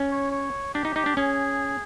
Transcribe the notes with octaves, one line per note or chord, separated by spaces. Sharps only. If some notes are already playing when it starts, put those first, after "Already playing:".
Already playing: C#4
C#5
C#5
D4 G4
D#4
D#4 G4
D4
C#4 G#4